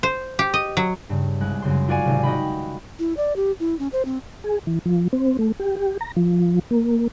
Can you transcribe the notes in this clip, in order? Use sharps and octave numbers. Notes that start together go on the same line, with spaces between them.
C5
G4
D#5
F#3
G2 C#3
C2 G#3 F#6
F#2 C#3 C6
F4 F#4 C#5 D5 F5 G#5
G#1 C3
F#4 D#5 G5 B5
E4
D5
G4
E4
C#4
C5
C4
G#4
E3
F3
C4
A3
G4
G4
A#5
F3
A#3